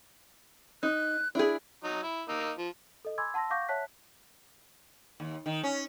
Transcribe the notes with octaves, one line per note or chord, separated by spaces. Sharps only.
D#4 F#6
D4 E4 G#4
F#3 D#4
E4
A#3 D#4 E6
F3
A4 D#5
G#5 B5 C6 D6 E6 G#6
F#5 A5 C6 E6 A#6
F5 F#5 C#6 D6 G6 A#6
C#5 E5 F#5 A5 F#6 B6
D#2
D#3
C#4